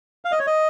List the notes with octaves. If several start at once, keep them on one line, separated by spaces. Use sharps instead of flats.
F5
D#5
C#5
D#5